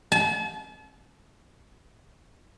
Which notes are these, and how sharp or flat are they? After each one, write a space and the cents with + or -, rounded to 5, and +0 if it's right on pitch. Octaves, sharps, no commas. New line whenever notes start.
A5 -40